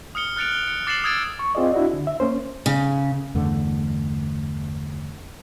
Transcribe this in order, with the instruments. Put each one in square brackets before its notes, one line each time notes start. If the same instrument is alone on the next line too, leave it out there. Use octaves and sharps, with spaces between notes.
[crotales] D#6 F6 C#7 G7
F6 F#6 A6 C#7 D7 F7
G7
C#7
D6 A6 C7 C#7 E7 F#7
D#6 E6 G#6 A6 D7 E7
[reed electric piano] C#6
C4 F4 G#4 D5 D#5
D4 E4 F#4
D3
E5
A#3 C#4 C5
[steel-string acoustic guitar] C#3
[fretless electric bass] E2 G2 D3 A3